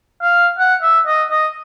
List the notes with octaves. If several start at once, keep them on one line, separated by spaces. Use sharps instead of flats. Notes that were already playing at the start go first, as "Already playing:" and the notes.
F5
F#5
E5
D#5
D#5